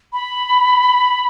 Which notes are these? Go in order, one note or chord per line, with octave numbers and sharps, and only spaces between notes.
B5